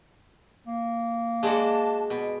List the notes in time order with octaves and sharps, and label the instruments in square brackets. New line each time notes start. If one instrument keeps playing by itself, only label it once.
[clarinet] A#3
[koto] G#3 D4 F#4 [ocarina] A5
[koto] B2